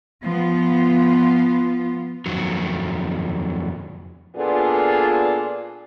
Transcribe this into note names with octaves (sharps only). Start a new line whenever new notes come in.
F3 B3 F4
F2 D#3 F#3
A#2 B3 D4 F4 G#4 A4